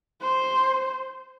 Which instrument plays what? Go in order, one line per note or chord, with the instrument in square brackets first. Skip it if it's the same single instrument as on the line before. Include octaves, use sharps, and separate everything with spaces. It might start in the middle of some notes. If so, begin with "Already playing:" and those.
[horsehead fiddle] C5